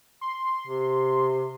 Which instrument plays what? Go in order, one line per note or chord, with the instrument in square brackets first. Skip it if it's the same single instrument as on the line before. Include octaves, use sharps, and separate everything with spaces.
[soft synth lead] C6
[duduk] C3